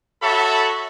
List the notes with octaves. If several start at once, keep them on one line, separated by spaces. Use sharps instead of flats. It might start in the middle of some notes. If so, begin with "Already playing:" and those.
F#4 A4 C#5 E5 A5 B5